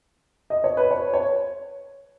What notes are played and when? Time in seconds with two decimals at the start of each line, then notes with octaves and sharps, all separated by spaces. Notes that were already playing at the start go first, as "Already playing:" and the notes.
0.50 D#5
0.64 C#5
0.77 B4
0.91 C#5
1.14 C#5